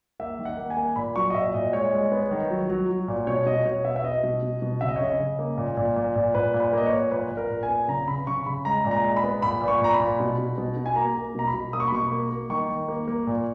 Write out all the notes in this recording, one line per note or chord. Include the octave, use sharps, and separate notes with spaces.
A#3 E5
D#3
F#5
A#3
G#5
A#3
A#2 B5
F#3 C#6
D#5
A#2 E5
A#2 D#5
G#3 C#5
G#3
B3
D#3
F#3
F#3
F#3
A#2
B2 C#5
B2 D#5
B2 C#5
B3 E5
E5
B3 D#5
B2
B2
B2
C#3 E5
D#5
C#5
C#3 D#5
C#3
A#3
A#2
A#2
A#2
A#2
A#2 B4
A#2
B4
A#3 D#5
C#5
A#2
A#2 B4
A#2
A#4
A#2
G#5
B3
C#3 A#5
C#3 B5
C#3 C#6
C#3 B5
G#3 A#5
A#2
A#5
G#3
B5
B3
A#2 B5
A#2
C#6
A#2 A#5
B5
A#2
B2
B2
B2
B2
G#5
A#3 A#5
A#3
B2 A#5
B5
B2
A#3 D#6
C#6
B5
B2 C#6
A#3
A#3
D#3 C#6
D#3
A#3
A#3
A#2